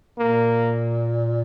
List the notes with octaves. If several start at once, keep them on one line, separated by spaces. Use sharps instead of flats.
A#2 A#3